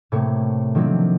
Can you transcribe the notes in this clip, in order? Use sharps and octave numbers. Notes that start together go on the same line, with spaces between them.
A2 C3 A3 A#3 C#5 C#6
D#3 F3 F#3 A#3 C4 D4